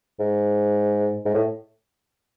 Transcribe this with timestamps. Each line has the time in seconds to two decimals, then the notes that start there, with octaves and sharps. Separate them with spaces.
0.20 G#2
1.25 G#2
1.34 A2